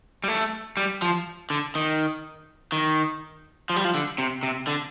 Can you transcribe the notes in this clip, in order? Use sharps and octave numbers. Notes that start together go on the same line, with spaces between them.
G3
A3
G3
F3
D3
D#3
D#3
F3
G3
F3
D3
C3
C3
D3